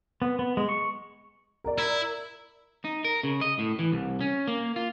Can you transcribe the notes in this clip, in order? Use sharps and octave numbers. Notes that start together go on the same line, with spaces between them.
B3
B3
G#3
C#6
A#4 D5
E4
D#4
A#4
C#3
D#5
A2
E3
C2
C#4
A#3
F4